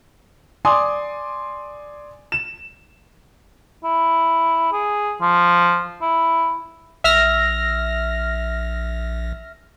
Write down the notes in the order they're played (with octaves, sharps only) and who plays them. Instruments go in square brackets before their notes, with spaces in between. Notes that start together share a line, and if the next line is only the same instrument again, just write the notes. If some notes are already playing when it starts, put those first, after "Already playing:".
[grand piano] D5 G#5 C6 D6 D#6
E7
[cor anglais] E4
G#4
F3
E4
[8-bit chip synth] A#1 [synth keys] E5 F6 A#6